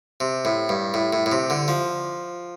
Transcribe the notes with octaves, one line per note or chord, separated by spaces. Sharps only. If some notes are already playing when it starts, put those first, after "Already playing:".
C3
A2
G2
A2
A2
A2
C3
D3
F3